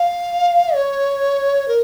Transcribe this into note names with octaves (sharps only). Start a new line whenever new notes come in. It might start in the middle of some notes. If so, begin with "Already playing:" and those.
Already playing: F5
C#5
A#4